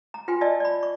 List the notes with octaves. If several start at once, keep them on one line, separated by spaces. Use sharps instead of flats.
A#5
F4 B4 G5 G#5 C6
F4 D5 D#5 A5 E6
D5 B5
C#6